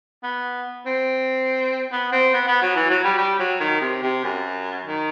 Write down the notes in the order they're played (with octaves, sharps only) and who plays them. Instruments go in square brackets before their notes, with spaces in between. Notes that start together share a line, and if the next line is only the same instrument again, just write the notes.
[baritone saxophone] B3
C4
B3
C4
B3
B3
F#3
E3
F#3
G3
G3
F#3
D#3
C3
C3
F#2
D#3